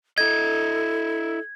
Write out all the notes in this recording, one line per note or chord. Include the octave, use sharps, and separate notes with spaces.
E4 A4 D#5 G#6